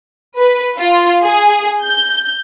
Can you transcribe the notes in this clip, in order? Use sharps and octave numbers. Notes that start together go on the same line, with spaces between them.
B4
F4
G#4
G6